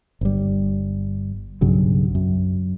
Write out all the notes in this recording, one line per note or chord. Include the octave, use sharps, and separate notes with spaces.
G1 G3
B1 G2 C#3 F#3
F#2